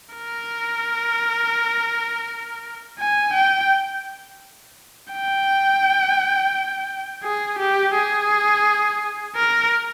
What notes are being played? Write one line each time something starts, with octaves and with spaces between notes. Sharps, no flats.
A#4
G#5
G5
G5
G#4
G4
G#4
A#4